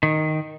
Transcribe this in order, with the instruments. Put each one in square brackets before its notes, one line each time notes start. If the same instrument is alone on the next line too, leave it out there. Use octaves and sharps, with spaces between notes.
[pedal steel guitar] D#3